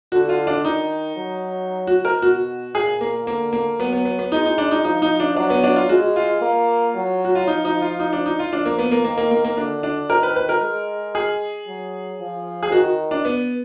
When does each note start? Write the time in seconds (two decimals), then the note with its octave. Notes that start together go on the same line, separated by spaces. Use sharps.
0.12 D3 F#4
0.29 F4
0.47 D4
0.64 D#3 D#4
1.16 F#3
1.87 F#4
2.05 A#4
2.22 B2 F#4
2.74 A#2 G#4
3.01 A#3
3.26 D3 A#3
3.53 A#3
3.79 F#3 B3
3.93 B3
4.05 B3
4.19 B3
4.32 G#3 D#4
4.46 D#4
4.58 D4
4.71 D#4
4.84 F3 D#4
5.02 D#4
5.20 D4
5.36 F#3 D4
5.50 B3
5.64 D4
5.76 F4
5.89 G#3 F#4
6.16 F4
6.41 A#3
6.95 F#3
7.25 F#4
7.35 F4
7.47 F3 D#4
7.65 D#4
7.82 F4
8.00 D#4
8.13 D4
8.26 D#4
8.39 F4
8.52 F3 D4
8.65 A#3
8.79 B3
8.91 A#3
9.05 D#3 A#3
9.18 A#3
9.31 A#3
9.44 A#3
9.57 D3 D4
9.83 D4
10.10 D#3 A#4
10.23 B4
10.36 B4
10.49 A#4
10.61 G#3
11.15 G#4
11.67 F#3
12.20 F3
12.63 G#4
12.71 D#3 F#4
13.11 D4
13.25 B3